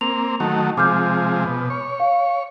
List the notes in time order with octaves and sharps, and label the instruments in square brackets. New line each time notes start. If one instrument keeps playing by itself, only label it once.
[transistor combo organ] A#3 C4 [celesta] F7
[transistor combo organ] D#3 F#3 A3
[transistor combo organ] C3 F3 G#3 [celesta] D6 F6 G6
[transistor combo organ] B2
C#5
[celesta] F5